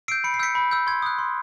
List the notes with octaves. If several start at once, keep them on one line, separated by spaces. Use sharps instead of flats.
E6 G6 C7 D7
B5 C#7
C7
E6 G6 B6 C#7
B5
E6 G6
C6 G#6
D#6 F#6
C6